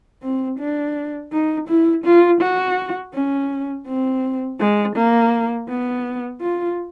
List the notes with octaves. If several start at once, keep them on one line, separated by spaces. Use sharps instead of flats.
C4
D4
D#4
E4
F4
F#4
C#4
C4
G#3
A#3
B3
F4